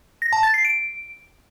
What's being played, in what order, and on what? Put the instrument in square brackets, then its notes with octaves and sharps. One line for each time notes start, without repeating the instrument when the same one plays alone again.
[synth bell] A#6
A5
A6
C7
D7